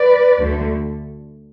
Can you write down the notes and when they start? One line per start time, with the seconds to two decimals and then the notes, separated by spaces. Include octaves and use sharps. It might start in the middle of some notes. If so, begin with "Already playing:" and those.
Already playing: B4 D5
0.39 D2 D3 A3